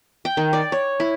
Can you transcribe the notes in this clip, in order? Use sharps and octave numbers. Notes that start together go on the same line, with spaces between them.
G5
D#3
D5
C#5
E4